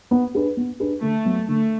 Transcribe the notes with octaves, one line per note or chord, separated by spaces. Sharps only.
B3
D4 G#4 B4
B3
D4 G#4 B4
D3 A3
F#3 B3
D3 A3